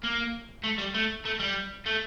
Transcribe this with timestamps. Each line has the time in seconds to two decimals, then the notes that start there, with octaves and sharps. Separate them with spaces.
0.03 A#3
0.64 A3
0.78 G3
0.95 A3
1.25 A3
1.40 G3
1.86 A3